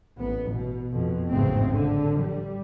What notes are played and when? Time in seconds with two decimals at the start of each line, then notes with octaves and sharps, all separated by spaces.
0.18 A1 B3
0.52 B2
0.94 F2 B2
1.31 A1 F2 G#2 C#3 A3 C4
1.73 D3
2.22 G3